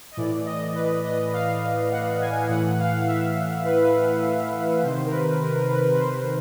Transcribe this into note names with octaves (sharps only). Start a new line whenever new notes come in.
D#5
A2 E3 D5
D#5
B4
D#5
F5
F#5
G#5
A2 E3 F#5
F5
E5
B4
C3 D#3 C5
A#4
B4
A#4
B4
A#4
B4
B4
C5